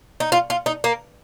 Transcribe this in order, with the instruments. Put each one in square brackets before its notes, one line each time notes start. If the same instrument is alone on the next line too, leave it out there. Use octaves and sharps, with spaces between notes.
[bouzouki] D#4
F4
F4
D#4
A#3